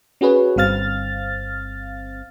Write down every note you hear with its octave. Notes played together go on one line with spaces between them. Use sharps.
C#4 F#4 G#4 B4 C#5
G1 G2 C4 F5 F6 A6